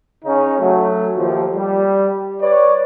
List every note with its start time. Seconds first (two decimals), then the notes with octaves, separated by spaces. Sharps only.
0.25 C#3 C#4 D#4
0.59 F#3 A3
1.16 D#2 F3
1.56 G3
2.41 B4 C#5 D5